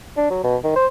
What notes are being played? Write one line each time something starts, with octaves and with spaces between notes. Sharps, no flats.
D4
F#3
B2
D#3
C5